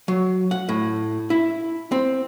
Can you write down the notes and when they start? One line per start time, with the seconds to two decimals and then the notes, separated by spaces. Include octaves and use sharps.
0.08 F#3
0.51 F#5
0.69 A2
1.30 E4
1.92 C4